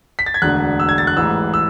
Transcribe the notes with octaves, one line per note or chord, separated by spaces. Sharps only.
B6
A6
G#6
E1 D2 D3 F#6
E6
G#6
A6
F#6
A1 G#2 E3 E6
E6